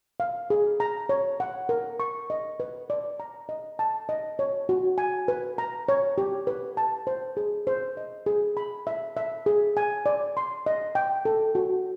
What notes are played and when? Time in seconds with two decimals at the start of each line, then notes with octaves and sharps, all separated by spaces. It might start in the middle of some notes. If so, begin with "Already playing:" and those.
0.20 F5
0.50 G#4
0.80 A#5
1.09 C#5
1.40 F#5
1.69 A#4
2.00 C#6
2.30 D#5
2.60 B4
2.90 D5
3.20 A#5
3.49 D#5
3.79 A5
4.09 D#5
4.39 C#5
4.69 F#4
4.98 G#5
5.28 B4
5.58 A#5
5.89 C#5
6.18 G4
6.47 B4
6.77 A5
7.07 C5
7.37 G#4
7.67 C5
7.97 D#5
8.26 G#4
8.57 B5
8.87 E5
9.17 E5
9.46 G#4
9.77 G#5
10.06 D5
10.37 C6
10.66 D#5
10.95 G5
11.25 A4
11.55 F#4